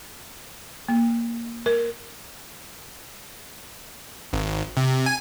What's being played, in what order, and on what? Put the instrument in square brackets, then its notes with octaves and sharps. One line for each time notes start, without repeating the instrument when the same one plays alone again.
[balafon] A#3
A#4
[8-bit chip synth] G#1
C3
G#5